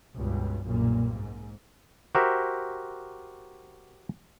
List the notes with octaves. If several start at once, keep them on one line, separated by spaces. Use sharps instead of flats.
C#2 G2 B2
B1 F#2 A#2 G3 A#3
G#2
F#4 G4 A#4 C5 E5